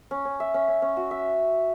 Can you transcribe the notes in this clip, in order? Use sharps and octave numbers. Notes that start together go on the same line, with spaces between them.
C#4
C#4
E5
C#4
C#4
C#4
F#4
E5